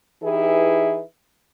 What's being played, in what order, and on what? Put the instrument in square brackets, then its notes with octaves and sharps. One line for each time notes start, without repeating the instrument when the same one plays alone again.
[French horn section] E3 D#4 E4 G4 G#4 B4